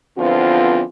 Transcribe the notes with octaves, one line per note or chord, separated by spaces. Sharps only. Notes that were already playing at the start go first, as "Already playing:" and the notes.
E2 D3 F3 B3 C4 F4